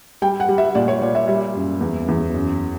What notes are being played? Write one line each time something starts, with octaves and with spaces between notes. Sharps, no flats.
G3 G5
F#5
G3
E5
A#2 D5
C#5
A#2 D5
E5
G3 E5
F#2
E2
E2
F#2